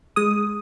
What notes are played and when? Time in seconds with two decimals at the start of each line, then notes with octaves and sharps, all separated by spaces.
0.16 G#3 D#6